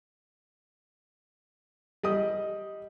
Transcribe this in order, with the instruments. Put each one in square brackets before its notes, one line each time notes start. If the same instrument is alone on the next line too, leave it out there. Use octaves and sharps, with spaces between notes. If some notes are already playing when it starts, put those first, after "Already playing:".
[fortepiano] G3 D#5 D#6